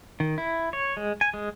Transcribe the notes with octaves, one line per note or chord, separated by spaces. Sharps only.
D#3
E4
C#5
G#3
G#5
G#3